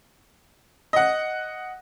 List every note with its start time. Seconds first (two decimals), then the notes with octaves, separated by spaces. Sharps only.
0.93 D#5 F#5